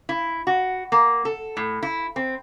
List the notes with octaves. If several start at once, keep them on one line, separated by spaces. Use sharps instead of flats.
E4
F#4
A#3
A4
A2
E4
C4